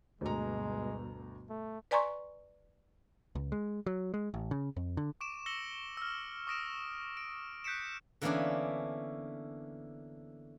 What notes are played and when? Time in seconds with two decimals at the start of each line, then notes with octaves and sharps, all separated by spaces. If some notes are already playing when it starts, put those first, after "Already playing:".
0.21 D2 G2 B2 G#3 A#5
1.49 A3
1.91 B4 D5 G#5 A#5 C6 C#6
3.35 C#2
3.52 G#3
3.86 F#3
4.14 G#3
4.34 A1
4.51 C#3
4.77 F2
4.97 D3
5.21 C#6 D6 D7 E7
5.46 E6 A#6 C#7 F#7 G7
5.97 E6 F6
6.47 C#6 D#6 A#6 D7 E7
7.17 D7
7.64 F#6 G6 B6 C#7 D7 E7
8.22 D3 E3 A#3 B3 C#4 D4